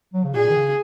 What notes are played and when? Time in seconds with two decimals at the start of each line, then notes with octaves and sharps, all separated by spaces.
0.14 F#3
0.24 C#3
0.34 A#2 G#4
0.50 D#3
0.56 C#3